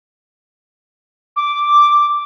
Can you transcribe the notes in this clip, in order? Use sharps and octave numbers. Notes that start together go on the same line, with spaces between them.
D6